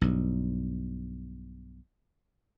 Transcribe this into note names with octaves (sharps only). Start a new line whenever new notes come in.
B1 G2